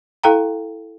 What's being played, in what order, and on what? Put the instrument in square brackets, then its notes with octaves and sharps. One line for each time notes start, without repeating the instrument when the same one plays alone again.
[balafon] E4 A4 F5 G5 A#5